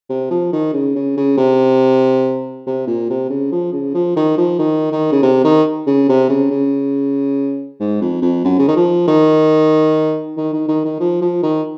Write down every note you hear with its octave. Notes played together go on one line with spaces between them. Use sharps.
C3
F3
D#3
C#3
C#3
C#3
C3
C3
A#2
C3
C#3
F3
C#3
F3
D#3
F3
D#3
D#3
C#3
C3
D#3
C#3
C3
C#3
C#3
G#2
F2
F2
F#2
C#3
D#3
F3
D#3
D#3
D#3
D#3
D#3
F3
F3
D#3